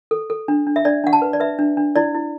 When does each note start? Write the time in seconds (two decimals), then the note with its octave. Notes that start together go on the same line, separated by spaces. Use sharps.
0.11 A4
0.30 A4
0.48 D4
0.67 D4
0.76 E5
0.85 D4 D5
1.04 D4 F#5
1.13 A5
1.22 B4
1.33 D5
1.40 B4 E5
1.59 D4
1.77 D4
1.96 E4 D5
2.15 E4